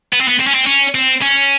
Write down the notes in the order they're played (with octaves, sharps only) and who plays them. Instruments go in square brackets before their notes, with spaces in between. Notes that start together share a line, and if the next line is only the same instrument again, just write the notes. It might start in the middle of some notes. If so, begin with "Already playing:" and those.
[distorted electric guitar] B3
C4
B3
C4
C#4
C4
C#4
C4
C#4